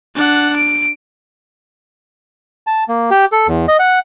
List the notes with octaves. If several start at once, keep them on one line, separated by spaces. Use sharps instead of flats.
D4 F#5
D7
A5
A#3
G4
A4
E2
D#5
F#5